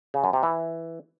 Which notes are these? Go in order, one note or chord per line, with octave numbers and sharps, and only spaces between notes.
C#3
F#2
C3
E3